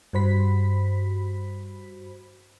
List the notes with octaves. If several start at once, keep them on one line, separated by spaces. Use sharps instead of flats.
G2 F#4 C5 B5 B6